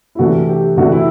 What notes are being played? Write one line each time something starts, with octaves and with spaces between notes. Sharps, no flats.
E4
C3 E3 A3 D4 F#4
G4
C3 E3 A3 D4 F#4
E4